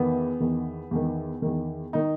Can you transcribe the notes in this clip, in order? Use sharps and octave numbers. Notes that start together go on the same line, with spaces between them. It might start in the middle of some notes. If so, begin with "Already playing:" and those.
Already playing: E2 D#3 B3
E2 D#3
E2 D#3
E2 D#3
D#3 D#4